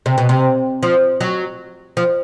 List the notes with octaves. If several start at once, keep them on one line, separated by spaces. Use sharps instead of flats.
C3
B2
C3
F3
F#3
F3